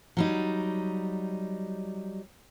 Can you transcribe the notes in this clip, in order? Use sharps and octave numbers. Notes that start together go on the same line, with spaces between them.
F#3 G3 D#4